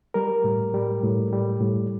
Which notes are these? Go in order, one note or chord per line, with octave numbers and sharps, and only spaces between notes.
G3 A#4
A2
G3
A2
G3
A2